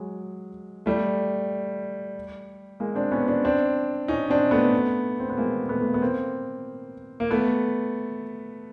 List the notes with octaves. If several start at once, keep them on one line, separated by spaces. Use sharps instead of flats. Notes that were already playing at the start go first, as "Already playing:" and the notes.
Already playing: F#3 G#3
G3 A3
G#3 A#3
C4 D4
B3 C#4
C4 D4
C4 D4
C#4 D#4
C4 D4
A3 B3
C4
B3
G#3 A#3
A3 B3
A3
A#3
B3
A#3 C4
A#3
A3 B3